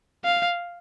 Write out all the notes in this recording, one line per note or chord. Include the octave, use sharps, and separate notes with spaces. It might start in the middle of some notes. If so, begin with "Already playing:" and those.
F5